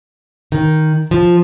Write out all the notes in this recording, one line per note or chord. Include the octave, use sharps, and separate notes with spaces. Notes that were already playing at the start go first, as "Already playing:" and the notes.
D#3
F3